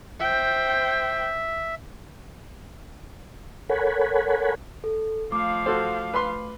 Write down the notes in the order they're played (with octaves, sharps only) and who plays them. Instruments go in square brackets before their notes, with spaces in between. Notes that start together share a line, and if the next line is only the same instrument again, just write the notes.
[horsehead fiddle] C5 G5 [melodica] E5
[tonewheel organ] A4 A#4 C#5 F#5 G#5 B5
[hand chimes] A4
[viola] F3 F5 [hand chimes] A3 D6
[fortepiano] F#4 A4 C5
B4 B5 C6